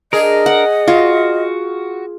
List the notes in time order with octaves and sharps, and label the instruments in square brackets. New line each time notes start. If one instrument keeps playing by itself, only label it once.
[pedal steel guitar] D4 A#4 [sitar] G#4 [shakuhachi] D#5
[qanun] F#5
[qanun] F4 [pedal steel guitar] F#4